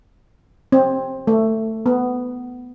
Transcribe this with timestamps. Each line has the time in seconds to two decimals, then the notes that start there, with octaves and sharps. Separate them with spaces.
0.72 C4
1.27 A3
1.86 B3